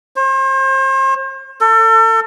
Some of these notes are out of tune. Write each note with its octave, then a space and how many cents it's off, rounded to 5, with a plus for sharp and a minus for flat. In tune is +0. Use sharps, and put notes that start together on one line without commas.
C5 +40
A4 +35